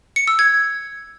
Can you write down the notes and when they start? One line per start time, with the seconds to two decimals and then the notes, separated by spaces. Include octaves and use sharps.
0.16 C#7
0.28 E6
0.39 G#6